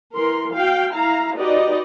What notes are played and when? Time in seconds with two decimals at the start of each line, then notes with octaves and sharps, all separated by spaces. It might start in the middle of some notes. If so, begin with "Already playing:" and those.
0.14 E3 A#4 C6
0.53 F#4 F5 G5
0.93 E4 F5 A#5
1.36 D#4 F#4 G4 B4 D5 D#5